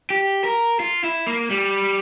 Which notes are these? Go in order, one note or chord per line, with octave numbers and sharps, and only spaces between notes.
G4
A#4
F4
E4
A#3
G3